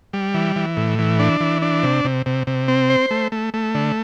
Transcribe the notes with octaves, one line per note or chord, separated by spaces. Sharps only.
G3
E3
E3
A2
E3
D4
E3
D4
C3
C3
C3
C3
C4
C5
A3
A3
A3
D3